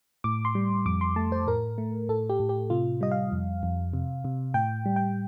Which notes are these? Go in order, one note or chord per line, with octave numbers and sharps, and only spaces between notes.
A2 D6
C6
G3
F2 D6
C6
A3 A5
C5
A2 A#4
A3
A2 A4
G4
A2
G4
C3 F4
G3 D#5
F5
F2
F2
C3
C3
A2 G5
G3
G5